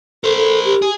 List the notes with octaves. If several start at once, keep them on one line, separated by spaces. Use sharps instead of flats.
A4 A#4 C5
A4
G4
G#4